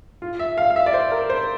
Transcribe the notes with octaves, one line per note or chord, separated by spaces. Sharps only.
F4
E5
F5
F5
E5
D5
C5
A#4
C5